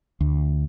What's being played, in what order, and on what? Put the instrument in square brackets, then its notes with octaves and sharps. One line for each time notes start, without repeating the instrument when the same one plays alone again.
[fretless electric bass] D2